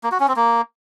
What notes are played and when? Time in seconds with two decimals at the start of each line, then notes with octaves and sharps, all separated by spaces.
0.04 A#3
0.12 F#4
0.20 C#4
0.28 C4
0.36 A#3